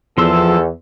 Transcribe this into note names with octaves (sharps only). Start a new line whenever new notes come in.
E2 F3 A4 C6 E6